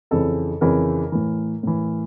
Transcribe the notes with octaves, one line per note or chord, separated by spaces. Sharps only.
F2 C#3 E3 A4
F2 C#3 E3 A#4
A2 E3
A2 E3